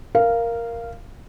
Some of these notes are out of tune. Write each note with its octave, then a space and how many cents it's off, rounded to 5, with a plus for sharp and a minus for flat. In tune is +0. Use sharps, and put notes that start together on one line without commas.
A#4 +0 F5 -10